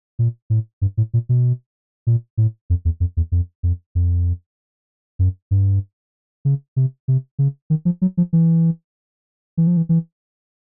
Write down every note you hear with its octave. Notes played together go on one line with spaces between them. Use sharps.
A#2
A2
G2
A2
A#2
B2
A#2
A2
F2
E2
F2
E2
F2
F2
F2
F#2
G2
C#3
C3
C3
C#3
D#3
F3
F#3
F3
E3
E3
F3
E3
E3